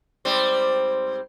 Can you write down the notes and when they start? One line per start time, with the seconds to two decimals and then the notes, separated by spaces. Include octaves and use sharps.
0.25 G#2 G3 C4